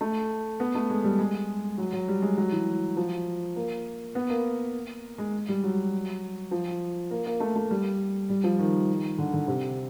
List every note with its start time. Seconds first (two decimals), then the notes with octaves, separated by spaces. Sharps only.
0.01 A3
0.60 B3
0.75 A3
0.90 G#3
1.04 G3
1.19 G#3
1.78 F#3
1.93 F#3
2.08 G3
2.22 G#3
2.37 F#3
2.52 E3
2.97 F3
3.56 A#3
4.15 B3
4.30 A#3
5.18 G#3
5.49 G3
5.64 F#3
6.51 F3
7.11 A#3
7.26 A#3
7.40 A3
7.55 A3
7.71 G3
8.29 G3
8.44 F3
8.59 D#3
9.18 D3
9.33 D3
9.48 C3